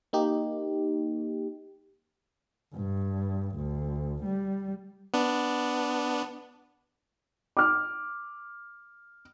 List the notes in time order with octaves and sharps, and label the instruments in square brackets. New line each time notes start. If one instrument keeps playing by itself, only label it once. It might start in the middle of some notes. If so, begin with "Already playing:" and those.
[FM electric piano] A#3 D#4 G4
[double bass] G2
D2
G3
[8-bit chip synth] B3 D4
[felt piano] D6 F6